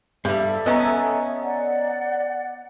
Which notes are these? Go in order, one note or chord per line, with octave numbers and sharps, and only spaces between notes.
G2 G3 A4 E5
B3 C#4 D#5 G#5 A#5
D5 F#5